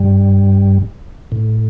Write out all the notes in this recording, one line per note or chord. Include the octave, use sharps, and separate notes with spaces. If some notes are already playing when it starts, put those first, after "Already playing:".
Already playing: G2 G3
A2